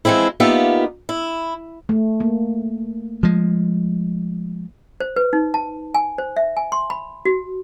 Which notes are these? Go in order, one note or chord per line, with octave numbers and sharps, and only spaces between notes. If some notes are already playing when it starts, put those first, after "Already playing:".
E3 F3 G#3 C4 E4
A#3 B3 D#4 F4 G4 E5
E4
A3
A#3
F3 G#3
C5
B4
D#4
A5
G#5
C5
E5
G#5
C6
B5
F#4